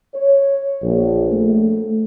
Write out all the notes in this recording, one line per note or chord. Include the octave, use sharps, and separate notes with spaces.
C#5
A#1
A3